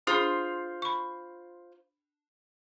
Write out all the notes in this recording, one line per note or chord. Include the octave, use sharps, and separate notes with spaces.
D4 F4 G#4 C5 D#6
B5 C#6